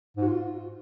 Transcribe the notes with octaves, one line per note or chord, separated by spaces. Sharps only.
G#2
F#4
F4